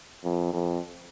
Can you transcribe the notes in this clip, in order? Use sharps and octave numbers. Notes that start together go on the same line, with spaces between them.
F2
F2